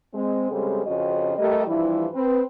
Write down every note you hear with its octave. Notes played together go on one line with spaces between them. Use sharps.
G#3 C4
C#3 G3 G#3 C4 G#4 A4
F2 C#3 C4 C#4 F#4 D#5
G3 A3 G4 A#4 D#5
G2 E3 F3 G3 E4
C4 B4